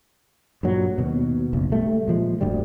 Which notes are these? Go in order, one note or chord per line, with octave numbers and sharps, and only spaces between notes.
G2 A#2 F#3
D#2 B2
F#1 B1
G3 A3
A#2 F3 G#3
D1 D2 G2 G3